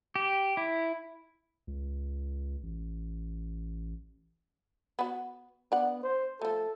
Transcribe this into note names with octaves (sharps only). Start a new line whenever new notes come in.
G4
E4
C#2
A1
B3 F#4
B3 D4 F#5
C5
F3 A3 A4